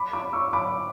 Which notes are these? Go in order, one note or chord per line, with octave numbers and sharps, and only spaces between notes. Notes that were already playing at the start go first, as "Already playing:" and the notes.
Already playing: B5 D6
B5 D6
C#6 E6
B5 D6